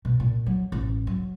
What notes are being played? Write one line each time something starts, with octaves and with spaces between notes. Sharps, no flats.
B2
A#2
F#3
A1
F#3